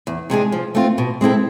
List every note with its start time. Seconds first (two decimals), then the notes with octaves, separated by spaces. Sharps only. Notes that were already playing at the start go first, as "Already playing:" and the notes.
0.07 E2
0.30 C3 G#3 D4 G#4
0.52 F3
0.75 A3 C4 F4
0.98 B2
1.21 G#3 C4 E4 A4